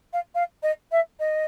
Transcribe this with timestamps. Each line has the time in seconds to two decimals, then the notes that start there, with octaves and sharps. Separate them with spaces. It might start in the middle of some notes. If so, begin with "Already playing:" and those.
0.13 F5
0.35 F5
0.63 D#5
0.92 E5
1.20 D#5